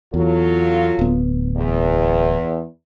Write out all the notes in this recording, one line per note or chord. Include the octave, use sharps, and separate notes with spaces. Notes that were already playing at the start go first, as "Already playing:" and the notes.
E2 F#3 F4 A4
D1 B3
E2